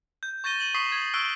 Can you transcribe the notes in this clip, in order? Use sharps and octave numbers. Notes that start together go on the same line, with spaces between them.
G6
C#6 G6 A6 A#6 D#7 G7
D#7 F#7 G7
C#6 D#6 B6 C7
G#6
C#6 E6 F#6 D7 G7